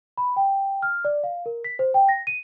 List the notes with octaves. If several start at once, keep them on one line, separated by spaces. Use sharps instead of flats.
B5
G5
F6
D5
F5
A#4
B6
C5
G5
A#6
D#7